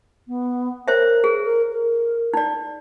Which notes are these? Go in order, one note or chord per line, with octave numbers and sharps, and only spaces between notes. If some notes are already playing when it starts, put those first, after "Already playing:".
B3
A#4 C5 C#5 E5
G#4
A#4
A#4
D#4 D5